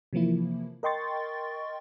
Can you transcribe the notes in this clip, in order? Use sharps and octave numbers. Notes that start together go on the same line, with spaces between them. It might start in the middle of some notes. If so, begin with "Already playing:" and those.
C3 E3 F3 A#3 E4
A#4 D#5 G5 C6 C#6 A6